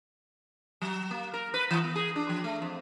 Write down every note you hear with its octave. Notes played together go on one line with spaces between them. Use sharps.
F#3
A#3
A#4
B4
E3
B3
G#4
D4
F3
A3
F2